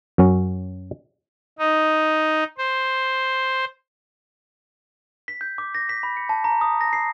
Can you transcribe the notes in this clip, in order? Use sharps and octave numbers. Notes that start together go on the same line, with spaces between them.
F#2 F#3 C#4
D#4
C5
B6
G6
D6
A#6
B6
B5
C#7
A5
A#5
D#6
A#6
C7